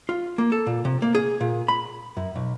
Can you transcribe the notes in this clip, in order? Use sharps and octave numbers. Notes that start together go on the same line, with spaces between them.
F4
A#3
A4
A#2
C3
A#3
G#4
A#2
B5
F#2
B1